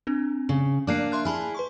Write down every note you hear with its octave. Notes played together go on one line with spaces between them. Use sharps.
C4 D4
C#3
A#3 D4 D6 F#6 C7
E5 C6 F#6
E4 G#4 A5 B5 F6
B4 C6 C#6